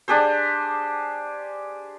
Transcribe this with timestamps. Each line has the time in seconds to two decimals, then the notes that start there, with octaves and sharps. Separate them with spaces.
0.08 D4 G4 G#4 C5